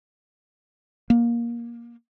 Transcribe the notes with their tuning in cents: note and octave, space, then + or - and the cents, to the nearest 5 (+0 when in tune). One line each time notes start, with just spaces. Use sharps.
A#3 +15